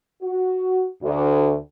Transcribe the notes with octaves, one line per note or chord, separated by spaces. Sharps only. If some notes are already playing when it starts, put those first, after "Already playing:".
F#4
D2